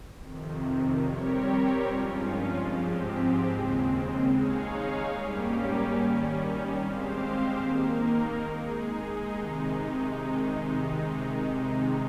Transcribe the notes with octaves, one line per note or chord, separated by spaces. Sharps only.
F2 C3 D#3
G3 C4 G4 A#4 C#5
G2 F3 G#3 C#4 F4
G#2 F3 G#3 C4 G4
D#2 C#3 G#3 C4
G#3 D#4 G#4 C#5 F5
G#2 G3 A#3 C#4 G4
D#3 G3 C#4
G#3 C4 G4 C5 F5
D#3 A#3 D#4 A#4
G#3 D#4 G#4
C3 D#3 G#3 D#4